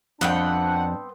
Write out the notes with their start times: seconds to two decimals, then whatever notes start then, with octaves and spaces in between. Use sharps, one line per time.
0.21 F2 B3 C4 D4 F#5 G5 A5